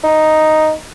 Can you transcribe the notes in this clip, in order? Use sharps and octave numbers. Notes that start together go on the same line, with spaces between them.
D#4